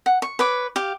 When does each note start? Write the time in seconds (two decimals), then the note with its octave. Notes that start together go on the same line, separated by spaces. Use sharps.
0.06 F#5
0.22 C#6
0.39 B4 C#5 D6
0.76 G4 F5